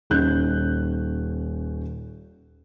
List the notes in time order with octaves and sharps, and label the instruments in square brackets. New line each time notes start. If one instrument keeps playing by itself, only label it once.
[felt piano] D#1 C#4 D#4 F#6 G6